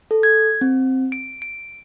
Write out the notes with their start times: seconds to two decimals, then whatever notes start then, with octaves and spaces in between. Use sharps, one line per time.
0.11 A4
0.23 G#6
0.61 C4
1.12 D7
1.42 D7